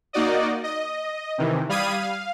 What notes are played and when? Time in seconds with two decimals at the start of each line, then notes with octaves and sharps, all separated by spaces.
0.13 A#3 D#4 F#4 D5 D#5
0.64 D#5
1.38 C3 D#3 E3
1.69 G3 F5 B5 D#6 G#6 D#7
2.00 F5